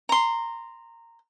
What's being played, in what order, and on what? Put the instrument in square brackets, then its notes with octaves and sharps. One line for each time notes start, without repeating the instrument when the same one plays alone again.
[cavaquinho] A#5 C6